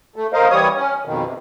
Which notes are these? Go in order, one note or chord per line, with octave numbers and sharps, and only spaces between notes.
A3
A#4 C5 D#5 F5
E3 G3 C#5 D#6
C#4
F2 B2 D#3
C3